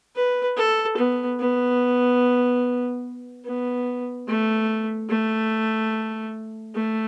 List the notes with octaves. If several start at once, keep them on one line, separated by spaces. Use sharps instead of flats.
B4
A4
B3
B3
B3
A3
A3
A3